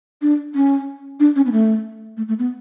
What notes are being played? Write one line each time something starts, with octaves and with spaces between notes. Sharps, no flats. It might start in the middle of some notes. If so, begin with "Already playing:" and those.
D4
C#4
D4
C#4
B3
A3
A3
A3
B3